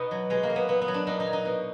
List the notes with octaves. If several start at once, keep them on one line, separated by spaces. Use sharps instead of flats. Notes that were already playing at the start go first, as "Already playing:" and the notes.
Already playing: B2 B3 D#4
F#3
B2 G#3
A#3
F#3
B3
A#2 B3
B3
F#3
D4
A#2 D#4
D#4
F#3
D#4
B2